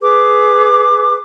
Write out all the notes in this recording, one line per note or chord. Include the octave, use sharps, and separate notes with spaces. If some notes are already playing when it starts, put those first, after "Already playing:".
G#4 B4 D6